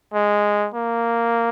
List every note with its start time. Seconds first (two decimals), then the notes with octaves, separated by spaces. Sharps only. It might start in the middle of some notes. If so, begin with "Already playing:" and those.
0.14 G#3
0.74 A#3